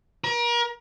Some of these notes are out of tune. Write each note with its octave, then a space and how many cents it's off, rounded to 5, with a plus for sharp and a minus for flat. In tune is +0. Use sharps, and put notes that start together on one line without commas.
A#4 +35